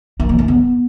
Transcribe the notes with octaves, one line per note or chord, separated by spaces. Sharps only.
A#3
D#3
A3
B3